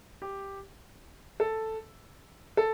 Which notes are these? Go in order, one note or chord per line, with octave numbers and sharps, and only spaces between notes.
G4
A4
A4